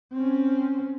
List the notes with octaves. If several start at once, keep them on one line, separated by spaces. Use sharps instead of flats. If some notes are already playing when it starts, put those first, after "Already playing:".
C4 C#4